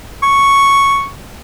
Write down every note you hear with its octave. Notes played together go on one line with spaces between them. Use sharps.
C#6